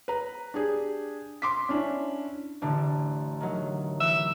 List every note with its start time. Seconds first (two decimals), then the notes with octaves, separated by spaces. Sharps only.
0.08 B4 A#5
0.54 D4 G4 G#4
1.42 C6 D6 B6
1.69 C#4 D4 E4
2.62 A1 D3
3.41 D#3 F#3
4.00 E3 E5